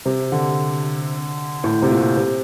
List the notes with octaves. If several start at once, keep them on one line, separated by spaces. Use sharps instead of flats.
C3
D3
A2
C3
A#2
C3